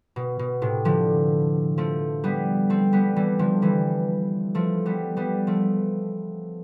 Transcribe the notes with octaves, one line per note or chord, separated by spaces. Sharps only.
B2
B2
A2 C3
D3 F3
F3 A3
G3 B3
A3 C4
G3 B3
E3 G3
D3 F3
E3 G3
F3 A3
G3 B3
G3 B3
F3 A3